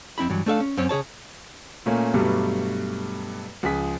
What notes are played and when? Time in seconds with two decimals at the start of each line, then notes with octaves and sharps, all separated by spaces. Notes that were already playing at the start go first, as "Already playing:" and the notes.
0.18 F2 C4 E4 B5
0.30 G2 E3 F#3
0.46 A3 D4 A4 E5 F5
0.60 C#4
0.77 F#2 C4 C#4 C#5
0.89 C#3 G#4 C#5 A5
1.86 A#2 A3 A#3 C#4
2.14 G2 B2 F#3 G3 A3
3.63 C#2 F3 G#4 B6